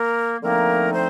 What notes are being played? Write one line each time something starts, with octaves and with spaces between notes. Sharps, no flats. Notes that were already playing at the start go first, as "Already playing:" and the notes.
Already playing: A#3 A#4
D3 F3 A3 A#3 C4 D#4 A#4
C4 C5